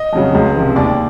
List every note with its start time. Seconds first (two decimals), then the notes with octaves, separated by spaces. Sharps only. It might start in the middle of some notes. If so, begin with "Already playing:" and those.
Already playing: D#5
0.13 F2 C#3 F#3
0.34 C#2
0.56 C3 F3
0.76 D#2 D5